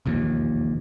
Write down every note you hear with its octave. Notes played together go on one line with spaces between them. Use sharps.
E1 A#1 D#2